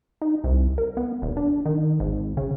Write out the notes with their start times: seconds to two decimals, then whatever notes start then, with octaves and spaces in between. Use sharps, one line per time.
0.22 D#4
0.44 C2
0.78 A#4
0.97 B3
1.22 D#1
1.37 D4
1.66 D#3
2.00 G#1
2.37 C#3